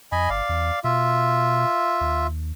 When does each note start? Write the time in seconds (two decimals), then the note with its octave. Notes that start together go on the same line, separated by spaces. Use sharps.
0.12 F2 D#5 G#5 B5
0.30 G1 D5 F5
0.49 E2
0.84 B2 F4 E5
2.01 D#2